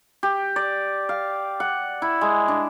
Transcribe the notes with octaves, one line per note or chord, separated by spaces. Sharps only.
G4
D5
F5
F#5
E4
G#3
D4